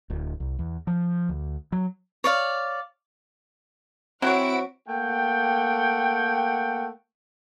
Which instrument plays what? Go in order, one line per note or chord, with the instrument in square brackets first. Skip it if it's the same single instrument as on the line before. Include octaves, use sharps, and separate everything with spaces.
[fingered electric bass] D1
C2
E2
F3
D2
F#3
[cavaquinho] C#5 D5 F5
[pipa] F#3 C#5 [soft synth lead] C4 [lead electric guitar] E4 [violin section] F#4 F#5 D7
[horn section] A3 A#3 F#5 G5